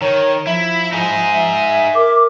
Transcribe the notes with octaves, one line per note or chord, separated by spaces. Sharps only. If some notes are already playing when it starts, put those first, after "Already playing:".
D#3 C#5
F3 E4 E5
D#4 G#4
A#4 D6